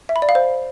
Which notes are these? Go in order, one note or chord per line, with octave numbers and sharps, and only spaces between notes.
E5
B5
D5
F5
C5